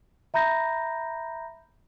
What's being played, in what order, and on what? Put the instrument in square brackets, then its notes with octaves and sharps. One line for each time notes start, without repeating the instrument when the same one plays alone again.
[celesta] E5 A#5 B5 G6 A#6